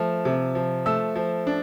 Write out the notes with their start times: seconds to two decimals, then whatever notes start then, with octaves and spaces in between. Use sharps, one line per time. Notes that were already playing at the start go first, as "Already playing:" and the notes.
Already playing: F3 A3
0.25 C3
0.55 F3
0.86 A3 E6
1.15 F3
1.47 D4